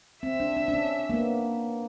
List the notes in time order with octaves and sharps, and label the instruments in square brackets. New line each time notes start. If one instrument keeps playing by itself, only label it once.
[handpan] C4 [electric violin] E5
[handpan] D4
D4
D4
C#4
A#3
B3